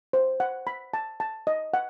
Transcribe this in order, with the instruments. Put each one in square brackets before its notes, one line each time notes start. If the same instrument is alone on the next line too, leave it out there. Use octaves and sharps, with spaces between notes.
[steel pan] C5
F#5
B5
A5
A5
D#5
F#5